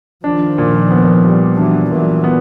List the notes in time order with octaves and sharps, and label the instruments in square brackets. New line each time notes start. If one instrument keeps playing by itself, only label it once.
[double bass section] D#3 F3 [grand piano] D4
[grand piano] A#2
B3
G3
[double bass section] E3 F#3 [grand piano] D4
[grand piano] A#2 [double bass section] E3 F#3
[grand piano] B3